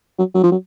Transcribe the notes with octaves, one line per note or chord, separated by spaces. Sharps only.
F#3
F#3
F3
F#3